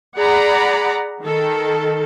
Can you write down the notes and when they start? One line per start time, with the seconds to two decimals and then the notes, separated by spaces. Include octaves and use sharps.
0.17 G#4 D5 F#5 A#5 B5
1.23 D#3 A4